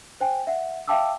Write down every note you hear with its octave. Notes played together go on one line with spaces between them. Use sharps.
C5 G5 G#5
E5 F#5
E5 F5 G5 A5 D6 E6